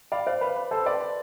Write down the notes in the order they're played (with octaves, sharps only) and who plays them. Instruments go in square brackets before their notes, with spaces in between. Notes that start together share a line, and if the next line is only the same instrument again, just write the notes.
[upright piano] D5 F5 [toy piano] B5
[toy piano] C5 [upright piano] D5 F5
[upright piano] B4 [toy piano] B5
[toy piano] B5
[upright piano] A4 C5 [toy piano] A5
[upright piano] B4 D5 [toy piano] C6
[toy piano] C6